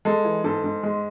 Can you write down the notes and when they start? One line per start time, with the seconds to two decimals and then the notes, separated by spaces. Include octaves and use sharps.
0.05 G#3 A4
0.25 E3
0.44 G#2 A4
0.64 G#2
0.83 G#3